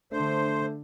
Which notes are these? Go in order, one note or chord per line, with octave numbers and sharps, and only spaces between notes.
D3 A3 D4 C5